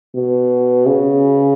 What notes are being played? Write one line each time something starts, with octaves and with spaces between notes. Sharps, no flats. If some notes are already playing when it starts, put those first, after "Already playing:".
B2
C#3